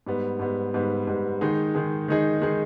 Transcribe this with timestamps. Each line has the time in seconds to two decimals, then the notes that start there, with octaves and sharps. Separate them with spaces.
0.06 G#2 G3 B3
0.39 G#2 G3 B3
0.74 G#2 G3 B3
1.07 G#2 G3 B3
1.41 D#3 G#3 D#4 G#4
1.75 D#3 G#3 D#4 G#4
2.08 D#3 G#3 D#4 G#4
2.41 D#3 G#3 D#4 G#4